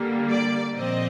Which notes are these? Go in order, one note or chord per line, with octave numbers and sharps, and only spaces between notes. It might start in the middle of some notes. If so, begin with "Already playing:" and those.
Already playing: D3 G3 A#3
D5
A#2 F3 C4 D#5